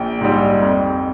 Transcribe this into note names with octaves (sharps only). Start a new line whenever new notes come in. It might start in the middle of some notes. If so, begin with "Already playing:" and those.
Already playing: A#1 G5
G#2 G3
F2